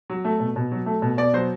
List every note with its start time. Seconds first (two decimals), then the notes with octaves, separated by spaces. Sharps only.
0.10 F#3
0.25 A3
0.40 B2
0.56 B2
0.72 F#3
0.86 A3
1.02 B2
1.18 B2 D5
1.33 F#3 C5